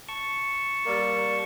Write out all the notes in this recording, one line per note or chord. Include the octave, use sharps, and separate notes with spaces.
A5 C#6
G3 A#3 D5